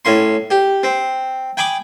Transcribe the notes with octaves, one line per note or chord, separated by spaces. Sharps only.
A2 C#4 C6
G4
C4
G5 G#5 B5 D6 D#6